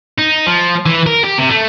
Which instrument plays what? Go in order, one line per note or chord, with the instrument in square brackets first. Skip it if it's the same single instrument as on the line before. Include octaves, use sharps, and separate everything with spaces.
[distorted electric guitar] D#4
F3
E3
A#4
G4
C3
A3